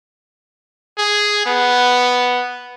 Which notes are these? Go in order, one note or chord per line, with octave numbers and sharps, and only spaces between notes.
G#4
B3